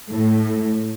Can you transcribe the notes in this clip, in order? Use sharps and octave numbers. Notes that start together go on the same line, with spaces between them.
A2